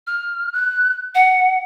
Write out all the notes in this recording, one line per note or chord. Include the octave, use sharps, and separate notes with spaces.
F6
F#6
F#5